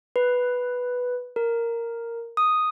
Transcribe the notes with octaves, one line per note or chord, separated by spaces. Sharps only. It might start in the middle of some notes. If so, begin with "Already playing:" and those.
B4
A#4
D#6